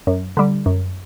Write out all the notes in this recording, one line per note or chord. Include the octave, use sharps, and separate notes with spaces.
F#2
D3 G3
F#2